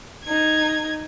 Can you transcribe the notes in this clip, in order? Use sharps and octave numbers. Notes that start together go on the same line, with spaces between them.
D#4 G#6